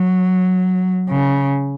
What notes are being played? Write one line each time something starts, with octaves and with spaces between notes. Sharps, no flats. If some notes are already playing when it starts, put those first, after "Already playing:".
Already playing: F#3
C#3